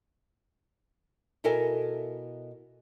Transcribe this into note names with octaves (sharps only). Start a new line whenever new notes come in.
B2 E4 A4 A#4 E5 G#5